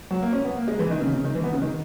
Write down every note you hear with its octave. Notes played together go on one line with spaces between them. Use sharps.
F#3
A#3
C#4
B3
A#3
G#3
E3
D#3
C#3
C#3
D#3
E3
B3
C#3
D#3